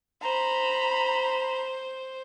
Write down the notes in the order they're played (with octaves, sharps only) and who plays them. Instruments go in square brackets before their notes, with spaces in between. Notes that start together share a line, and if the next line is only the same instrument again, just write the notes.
[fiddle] C5 [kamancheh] A#5 B5